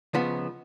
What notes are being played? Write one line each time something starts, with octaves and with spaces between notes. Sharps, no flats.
C#2 C#3 F3 B3 F#5